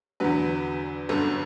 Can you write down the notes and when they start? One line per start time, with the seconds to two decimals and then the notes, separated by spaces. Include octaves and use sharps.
0.20 E2 D3 F#3 B4
1.09 G1 F#2 D3 A4